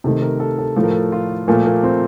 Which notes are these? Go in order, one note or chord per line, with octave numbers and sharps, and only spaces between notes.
C3 D#3 A3 A4
A#4
A4
A4
A2 F3 A3 A4
A#4
A4
F4
A#2 F3 A3 A#3
A#3
C4